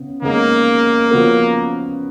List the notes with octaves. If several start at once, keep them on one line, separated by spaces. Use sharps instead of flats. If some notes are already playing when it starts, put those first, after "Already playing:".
Already playing: C#3 B3
C#3 G#3 A#3 B3 D#4 G#4
C#3 F3 B3 F#4 A#4